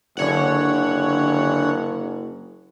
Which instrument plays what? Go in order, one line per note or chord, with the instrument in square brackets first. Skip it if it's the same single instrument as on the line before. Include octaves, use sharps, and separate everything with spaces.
[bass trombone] F#1 [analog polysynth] D3 C#5 F#5